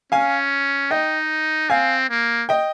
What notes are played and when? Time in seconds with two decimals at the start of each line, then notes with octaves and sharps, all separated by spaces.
0.12 C#4 F5 G#5
0.91 D#4 D#5 G5
1.70 C4 F5 G#5
2.10 A#3
2.49 D#5 G5